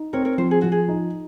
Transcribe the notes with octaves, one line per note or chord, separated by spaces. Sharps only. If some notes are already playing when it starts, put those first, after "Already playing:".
Already playing: D#4
C4 A#4 C#5
A#4 C#5
F3 C5
G#4
F3 F#4
G#4
D#4